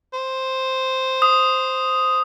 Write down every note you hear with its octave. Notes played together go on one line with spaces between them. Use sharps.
C5
D#6